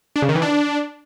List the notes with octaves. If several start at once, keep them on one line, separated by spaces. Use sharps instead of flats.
D4
C#3
D#3
E3
D4